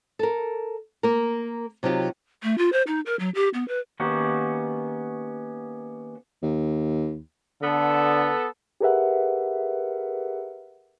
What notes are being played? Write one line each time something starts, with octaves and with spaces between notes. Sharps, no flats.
A4 A#4
A#3 A#4
C3 F#3 D#4 F4 G4
A3
F4
C5
D#4
A#4
F#3
G4
B3
B4
D#3 A#3 B3 C#4 F#4 G4
D#2
D3 B3 A4
G4 G#4 A#4 B4 E5 F#5